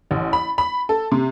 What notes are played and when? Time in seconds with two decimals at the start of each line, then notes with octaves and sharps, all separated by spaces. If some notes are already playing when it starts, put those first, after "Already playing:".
0.11 A1
0.33 B5
0.58 B5
0.89 A4
1.12 C3